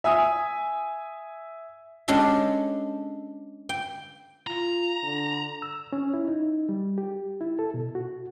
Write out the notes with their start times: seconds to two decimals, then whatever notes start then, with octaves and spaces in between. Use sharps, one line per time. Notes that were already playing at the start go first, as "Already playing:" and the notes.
0.04 E5 G#5 D#6
2.08 G#3 C#4 D4 G4 A4
3.69 G5
4.47 F4 A#5
5.03 D3
5.62 E6
5.93 C#4
6.14 E4
6.28 D#4
6.69 G3
6.98 G4
7.41 E4
7.59 A4
7.74 B2
7.95 F#4